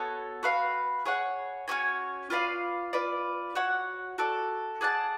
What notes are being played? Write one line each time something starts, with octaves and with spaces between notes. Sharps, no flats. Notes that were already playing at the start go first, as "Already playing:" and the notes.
Already playing: B3 F#4 A4 C#5
F#4 B4 F5
G#4 C#5 F#5
C#4 F#4 C#5 G#5
F4 B4 D5 F5
F4 B4 D5
F#4 C#5 F#5
F#4 A4 D5
G#4 D5 F#5 A5